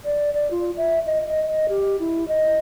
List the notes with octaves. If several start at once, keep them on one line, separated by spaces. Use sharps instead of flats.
D5
D5
F4
E5
D#5
D#5
D#5
G4
E4
D#5